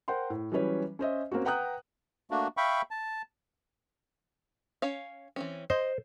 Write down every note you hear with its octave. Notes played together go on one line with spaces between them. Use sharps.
A#4 C5 F#5 G5 C6
A2
E3 F#3 G3 C#4 B4 C#5
C#4 C5 D#5 E5
A#3 C4 C#4 F#4
B4 F#5 G5 A#5 D#6 F#6
A3 A#3 D4 F#4
E5 F5 G5 B5 C#6
A5
C#4 C#5 F5
E3 C4 C#4
C5 D#5